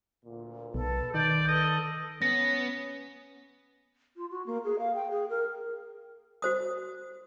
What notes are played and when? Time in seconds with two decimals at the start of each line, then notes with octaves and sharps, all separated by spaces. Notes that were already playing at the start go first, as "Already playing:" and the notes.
0.25 D2 A#2
0.74 B1 A4 B4
1.14 D#3 D5 G6
1.47 A4 D#5
2.22 B3 C#4 A#6
4.16 F4
4.31 F#4
4.46 A#3
4.64 G#4
4.79 F5
4.95 G5
5.11 G#4
5.30 A#4
6.42 F#4 C5 D#6